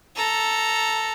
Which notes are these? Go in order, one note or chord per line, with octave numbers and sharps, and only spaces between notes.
A4 A#5